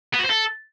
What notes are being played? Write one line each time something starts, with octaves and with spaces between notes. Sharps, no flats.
B3
F#4
C5
A4